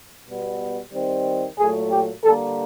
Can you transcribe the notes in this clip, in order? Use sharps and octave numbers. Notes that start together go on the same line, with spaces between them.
B2 G3 B3
D#3 G3 C4
A#2 F#3 A3 G#4
G4
D3 G3 A#3 A4